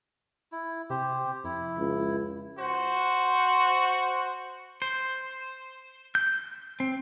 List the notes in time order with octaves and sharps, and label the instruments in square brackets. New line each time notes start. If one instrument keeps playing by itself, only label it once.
[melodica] E4
[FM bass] C3 [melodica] G4 C5
[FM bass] F2 [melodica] E4
[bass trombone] C#2
[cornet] F#4 [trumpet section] C5
[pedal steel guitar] C5
G6
C4